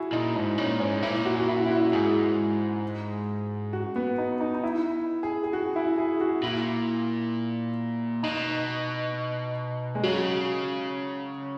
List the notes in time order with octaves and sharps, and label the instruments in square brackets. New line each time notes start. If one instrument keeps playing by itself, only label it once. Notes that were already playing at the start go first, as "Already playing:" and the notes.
Already playing: [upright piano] E4 F#4 G#4
[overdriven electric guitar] A#2 [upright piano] D#4
[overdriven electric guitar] G#2 [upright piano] D#4
[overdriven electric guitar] A#2 [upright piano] C#4
[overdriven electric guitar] G#2 [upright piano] C#4
[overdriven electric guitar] A#2 [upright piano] E4
[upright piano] F#4
F#4
E4
E4
F#4
[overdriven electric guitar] G#2 [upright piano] G#4
[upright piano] F#4
B3
D#4
D#4
D#4
E4
G#4
G#4
F#4
E4
G#4
F#4
[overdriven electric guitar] A#2 [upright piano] E4
[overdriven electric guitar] B2 [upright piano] D#4
[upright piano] G#3
[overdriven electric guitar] C#3 [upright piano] F#3